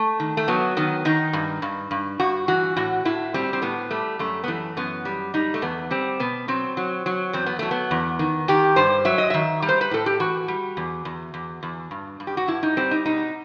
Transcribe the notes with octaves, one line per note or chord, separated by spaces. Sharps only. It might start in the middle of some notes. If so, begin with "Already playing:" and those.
Already playing: A3
D#3
A3
F#3 B3
D#3 B3
D#3 D#4
G2
G2
G2
G2 F#4
E3 F#4
A2 F#4
A2 E4
G3 C4
C4
A2 B3
G3 A3
F#2 A3
B3
E3 A3
F#2 B3
G3
G3 D#4
A3
E2 B3
G3 C4
B2 B3
F#3 C4
F#3
F#3
E2 C4
B3
F#3 A3
B3
E2
D#3
D#3 G4
G2 C5
F#3 E5
D#5
D#3 E5
G3
C5
B4
A2 A4
G4
E3 F#4
G3
E2
E2
E2
E2
G2
G2
G4
F#4
G2 E4
D#4
G3 C4
D#4
B2 D#4